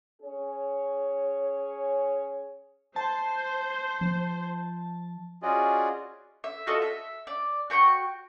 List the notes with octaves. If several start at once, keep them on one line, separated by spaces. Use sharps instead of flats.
C#4 G#4 C#5
C5 A5
F3
C#4 F4 F#4 G#4 D5 D#5
E5
F4 F#4 A4 D#5
E5
D5
F#4 G5 B5 C#6